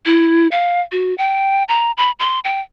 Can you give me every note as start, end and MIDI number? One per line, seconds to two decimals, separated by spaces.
0.06 0.48 64
0.51 0.81 77
0.92 1.16 66
1.18 1.63 79
1.68 1.92 82
1.97 2.11 83
2.19 2.39 84
2.44 2.60 79